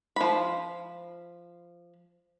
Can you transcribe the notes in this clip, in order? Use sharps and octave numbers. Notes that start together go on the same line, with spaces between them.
F3 B5